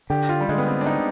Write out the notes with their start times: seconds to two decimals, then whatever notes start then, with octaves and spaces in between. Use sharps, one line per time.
0.10 D3 G4
0.29 F4
0.40 G3
0.49 D3 G#3
0.58 B3
0.68 C4
0.81 D4
0.86 D#4